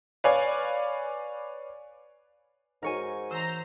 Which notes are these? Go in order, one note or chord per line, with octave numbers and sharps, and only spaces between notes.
B4 C#5 D5 F5 G#5
G#2 D#4 F#4 A#4 C#5 G#5
E3 C5 A#5 E6